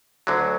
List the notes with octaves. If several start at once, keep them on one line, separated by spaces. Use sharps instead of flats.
D2 D3 F#3